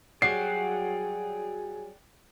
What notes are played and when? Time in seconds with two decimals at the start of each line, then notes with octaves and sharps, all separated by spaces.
0.22 F#3 G3 G#4 D5 F#5 G5 C7